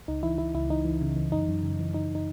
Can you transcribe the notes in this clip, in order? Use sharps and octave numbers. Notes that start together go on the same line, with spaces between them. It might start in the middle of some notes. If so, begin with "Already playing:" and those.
C#2 D#4
E3 E4
E3 E4
C#2 E4
E3 D#4
E3
C#3
E3
F#2 D#4
F#2
C#3
E3
E3 D#4
D#4